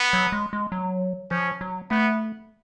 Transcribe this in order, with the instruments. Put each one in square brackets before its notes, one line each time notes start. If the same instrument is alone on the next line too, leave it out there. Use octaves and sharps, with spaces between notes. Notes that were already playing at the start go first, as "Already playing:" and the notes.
Already playing: [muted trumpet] B3
[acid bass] F#3
G#3
G#3
F#3
[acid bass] F3 [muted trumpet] C#4
[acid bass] F#3
[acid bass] A3 [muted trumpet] B3